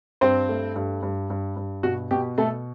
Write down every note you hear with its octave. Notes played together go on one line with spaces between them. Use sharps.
G2 C4 C5
A3
G2
G2
G2
G2
B2 F#4
B2 G4
B2 A3 A4